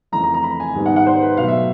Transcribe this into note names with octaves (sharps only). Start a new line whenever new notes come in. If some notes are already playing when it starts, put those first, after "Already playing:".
F2 C#3 E3 A3 A#5
A#5
A#5
B5
G#5
G#2 D#3 G3 B3
F#5
F#5
C5
B4
B2 F#3 A3 F5
E5